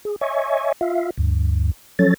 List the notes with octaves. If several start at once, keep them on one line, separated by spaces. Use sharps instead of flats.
G#4
C#5 D#5 E5 G#5 C#6
F4 E5 F5
D2 G2
F3 F#3 C#4 A4 C#5 A6